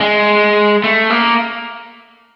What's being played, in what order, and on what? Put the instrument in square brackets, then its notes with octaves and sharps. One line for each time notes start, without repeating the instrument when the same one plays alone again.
[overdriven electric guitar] G#3
A3
A#3